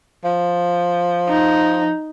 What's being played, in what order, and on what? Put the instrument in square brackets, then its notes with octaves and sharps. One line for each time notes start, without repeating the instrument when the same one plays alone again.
[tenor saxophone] F3
[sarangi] D#4